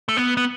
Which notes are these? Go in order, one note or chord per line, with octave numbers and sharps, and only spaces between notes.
A3
B3
B3